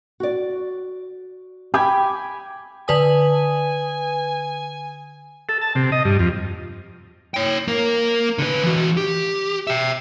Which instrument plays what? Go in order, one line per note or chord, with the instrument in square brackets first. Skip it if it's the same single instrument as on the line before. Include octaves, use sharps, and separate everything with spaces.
[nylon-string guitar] F#4 D5
[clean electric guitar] G4 [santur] G5 G#5 B5
[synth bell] D3 B4 D#6 [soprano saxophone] G#5
[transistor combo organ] A4
A5
C3
D#5
G2
F2
[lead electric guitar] C#5 G5
A#3 A#4
D3 B4
E3 F#4
G4
E5 G5